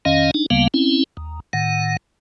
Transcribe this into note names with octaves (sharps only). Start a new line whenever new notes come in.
F2 D#3 C#4 D#5 F5
D4 D#4
D2 C#3 G3 A#3 B3 F5
C4 C#4 E4
D#2
A2 D#3 F#5